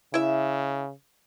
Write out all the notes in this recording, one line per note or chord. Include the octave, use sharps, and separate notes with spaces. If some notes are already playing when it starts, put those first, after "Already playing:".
C#3 E4 E5